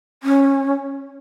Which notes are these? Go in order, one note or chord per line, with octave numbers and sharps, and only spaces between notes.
C#4